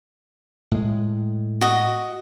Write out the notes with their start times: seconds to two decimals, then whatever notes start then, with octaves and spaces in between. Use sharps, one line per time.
0.71 A2 G#3
1.61 F#4 D#5